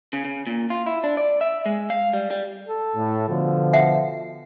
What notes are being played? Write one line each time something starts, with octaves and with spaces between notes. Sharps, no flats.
C#3
C#3
A#2
F4
E4
D4
D5
E5
G#3
F5
G3
G3
A4
A2
B2 D3 F3
E5 F#5 G5